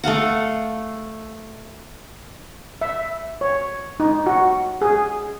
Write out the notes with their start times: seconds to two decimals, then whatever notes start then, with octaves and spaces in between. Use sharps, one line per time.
0.04 A3 A4 F5 F#5
2.82 E5
3.41 C#5
4.00 D#4
4.26 F#4
4.82 G#4